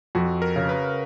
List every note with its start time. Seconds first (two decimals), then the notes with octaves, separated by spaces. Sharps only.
0.15 F2 F#4
0.42 A#4
0.56 C#3
0.69 B4